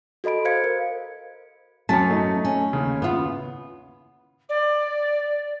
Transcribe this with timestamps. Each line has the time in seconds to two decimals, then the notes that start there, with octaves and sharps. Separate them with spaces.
0.24 F#4 A4 D#5 B5 D7
0.45 C5 F5 G#6 C#7
0.64 A#4
1.89 F#2 F#3 C#4 A5 B6
2.10 A3 D#4
2.45 C#4
2.73 D#2 C#3
3.02 B3 F4
4.49 D5